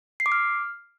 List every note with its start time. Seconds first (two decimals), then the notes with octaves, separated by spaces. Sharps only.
0.20 C7
0.26 D6
0.32 F6